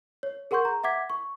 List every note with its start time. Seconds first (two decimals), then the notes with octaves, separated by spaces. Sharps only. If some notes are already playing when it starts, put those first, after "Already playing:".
0.23 C#5
0.51 G#4 A#4 F#5 C6 C#6 G6
0.65 A#5
0.83 E5 F#5 D6 G#6 B6
1.10 C#6